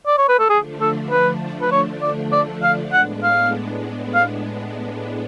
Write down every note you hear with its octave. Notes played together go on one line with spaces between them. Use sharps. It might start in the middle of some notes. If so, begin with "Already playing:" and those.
D5
C#5
B4
A4
D3 F3 A3 D4 G#4
A4
B4
B4
C#5
D5
D5
F5
A2 G#3 B3 D4 F#5
F5
F5